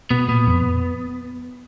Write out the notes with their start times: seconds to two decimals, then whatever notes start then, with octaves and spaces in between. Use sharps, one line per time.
0.10 B2 B3
0.28 A#2 B3
0.47 F2